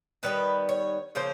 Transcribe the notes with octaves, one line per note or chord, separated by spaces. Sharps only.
D#3 G3 B3 B4
C#5
C#3 F3 A#3 C5